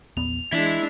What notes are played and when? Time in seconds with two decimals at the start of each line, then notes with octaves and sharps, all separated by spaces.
0.17 A#1 E2 B3 F7
0.53 E3 G#3 D4 E4 B6